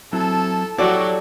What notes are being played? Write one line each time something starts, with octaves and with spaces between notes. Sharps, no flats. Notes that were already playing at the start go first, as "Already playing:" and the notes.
F#3 C4 E4 A4 A5
F#3 E4 F#4 G4 A4 D5